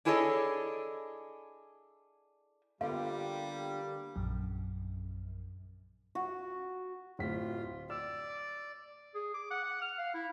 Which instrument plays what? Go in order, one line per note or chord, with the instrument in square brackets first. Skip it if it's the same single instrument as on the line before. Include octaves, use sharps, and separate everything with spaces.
[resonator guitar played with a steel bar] D4 E4 G#4 A4 C#5 D#5
[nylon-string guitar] D3 B3 F4 [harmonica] G3 [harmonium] A#3 G4 [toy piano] F5
[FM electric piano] A#1 F#2
[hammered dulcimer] F#4
[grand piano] D1 B6 [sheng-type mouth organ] F4
[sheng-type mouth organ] D5 [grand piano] E6
[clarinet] G#4
D6
F#5
F#5
F6
F5
E4